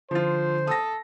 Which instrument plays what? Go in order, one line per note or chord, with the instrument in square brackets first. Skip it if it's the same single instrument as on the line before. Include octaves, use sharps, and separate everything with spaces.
[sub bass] D3 [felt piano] F3 F4 [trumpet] C5
[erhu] A4 [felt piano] D#6 A#6